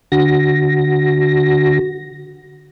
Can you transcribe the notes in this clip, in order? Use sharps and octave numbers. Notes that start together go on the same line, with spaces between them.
D3 F#4 A#6